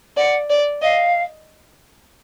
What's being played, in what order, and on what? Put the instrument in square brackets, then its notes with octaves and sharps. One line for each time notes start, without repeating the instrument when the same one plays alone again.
[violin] D5 [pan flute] F#5
[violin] D5
[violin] D#5 [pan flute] F5